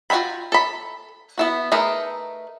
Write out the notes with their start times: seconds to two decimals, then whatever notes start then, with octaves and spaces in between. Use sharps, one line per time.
0.10 F4 F#4 E5 G5 B5
0.52 A4 B5
1.38 B3 E4 F#4
1.72 A3 D#4 G#4 A#4 B4